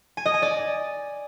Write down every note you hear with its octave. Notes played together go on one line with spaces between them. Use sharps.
G#5
D#5
G#5
D5